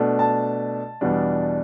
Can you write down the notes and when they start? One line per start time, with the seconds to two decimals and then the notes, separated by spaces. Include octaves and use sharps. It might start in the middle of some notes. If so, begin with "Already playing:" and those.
Already playing: B2 A3 D4
0.19 A5
1.01 E2 B2 G3 D4